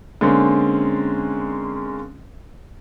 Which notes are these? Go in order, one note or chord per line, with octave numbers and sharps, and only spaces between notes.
D3 G#3 A#3 C4 C#4